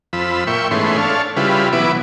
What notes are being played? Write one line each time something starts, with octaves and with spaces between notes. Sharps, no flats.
F2 F3 B5 E6
A#2 E5 G5 C#6
G#2 E3 A3 B3 C#4 C6
D4 A4 C#5 F5
C#3 G3 E4 F4 B4
B2 E3 F#3 B3 E4 D6